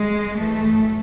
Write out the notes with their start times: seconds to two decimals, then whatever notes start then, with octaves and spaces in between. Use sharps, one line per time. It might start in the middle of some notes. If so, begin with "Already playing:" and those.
Already playing: G#3
0.35 F#2 E3 A3